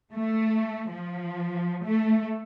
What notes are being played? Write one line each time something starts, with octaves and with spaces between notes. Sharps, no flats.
A3
F3
A3